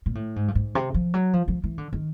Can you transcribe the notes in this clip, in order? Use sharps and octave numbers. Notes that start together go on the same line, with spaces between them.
A#2
A2
G#2
G2
G#2
C3
F3
F#3
F3
F3
E3
D3
D#3